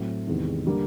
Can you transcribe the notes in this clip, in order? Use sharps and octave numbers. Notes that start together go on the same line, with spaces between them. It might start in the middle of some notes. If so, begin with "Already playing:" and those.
Already playing: A2 F#3 A3 C4
E2 C3 D#3 G#3
D3 G3 A#3